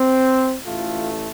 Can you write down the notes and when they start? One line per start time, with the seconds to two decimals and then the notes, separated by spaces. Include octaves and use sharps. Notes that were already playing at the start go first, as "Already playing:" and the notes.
Already playing: C4
0.65 A1 A2 A3 F4